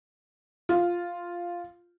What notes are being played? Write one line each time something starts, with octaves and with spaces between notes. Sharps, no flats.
F4